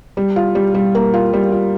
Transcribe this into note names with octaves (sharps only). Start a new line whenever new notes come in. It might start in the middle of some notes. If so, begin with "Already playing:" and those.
G3
F4
G3
G3
A#3
F4
G3
F4